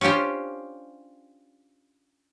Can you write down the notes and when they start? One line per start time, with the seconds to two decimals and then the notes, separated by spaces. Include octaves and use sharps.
0.01 C#4 D4 F4 G4 C5